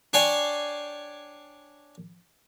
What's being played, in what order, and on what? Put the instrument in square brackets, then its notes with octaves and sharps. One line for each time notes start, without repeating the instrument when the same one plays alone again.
[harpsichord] D4 C#5 D5 G5 G#5 C6